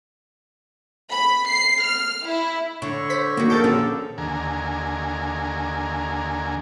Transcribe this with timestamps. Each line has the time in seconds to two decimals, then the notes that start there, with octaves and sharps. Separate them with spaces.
1.10 B5
1.47 C7
1.83 F6
2.24 E4
2.82 D3 C#5 C#6
3.10 C5 B6
3.37 D#3 A#3 F#4
3.50 A#1 C#3 A4 A#4 G6 A6
3.64 D3 C#4
4.18 D#2 D3 G#5 A#5